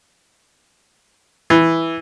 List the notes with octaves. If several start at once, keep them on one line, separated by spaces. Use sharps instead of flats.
E3